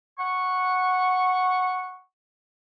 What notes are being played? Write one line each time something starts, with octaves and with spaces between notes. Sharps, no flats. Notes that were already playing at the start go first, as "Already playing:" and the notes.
F#5 C#6